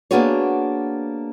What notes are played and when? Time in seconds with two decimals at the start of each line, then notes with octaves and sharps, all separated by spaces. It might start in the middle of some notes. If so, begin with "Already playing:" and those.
0.11 A#3 B3 D4 F#4 G#4 C#5